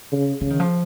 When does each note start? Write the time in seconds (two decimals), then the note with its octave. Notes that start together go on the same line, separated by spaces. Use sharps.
0.12 C#3
0.41 C#3 F3
0.50 D#3
0.60 F3